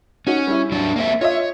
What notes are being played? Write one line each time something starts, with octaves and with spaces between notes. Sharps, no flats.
C#4 D#4 F#4
G3 E4
F#3 D4
A#3 C4 E5
F4 C#5 D#5 E5